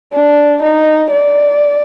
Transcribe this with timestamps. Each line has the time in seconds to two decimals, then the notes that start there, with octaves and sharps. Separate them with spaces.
0.13 D4
0.62 D#4
1.11 D5